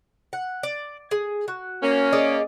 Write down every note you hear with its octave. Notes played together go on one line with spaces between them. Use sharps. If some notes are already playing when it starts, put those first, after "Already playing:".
F#5
D5
G#4
F#4
A#3 C#4
G#4 D5 D#5